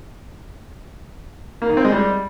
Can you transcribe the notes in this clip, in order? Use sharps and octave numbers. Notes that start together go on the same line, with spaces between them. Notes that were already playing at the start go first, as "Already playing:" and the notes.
A#3
D#3
C4
G#3
G3